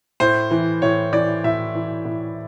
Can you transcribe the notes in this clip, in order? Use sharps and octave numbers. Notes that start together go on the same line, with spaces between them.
A2 C5
E3
A2 C#5
E3 D5
A2 E5
E3
A2